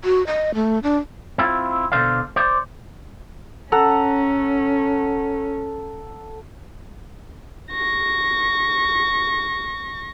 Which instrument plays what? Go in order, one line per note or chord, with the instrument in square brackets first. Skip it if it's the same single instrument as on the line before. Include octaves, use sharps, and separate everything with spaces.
[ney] F#4
D#5
A3
D4
[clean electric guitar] C4 E4 F4
B2 D3 A4 C5 D5 F5
C5 D5
[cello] C#4 [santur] A4 F#5 A#5
[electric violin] C#6 A#6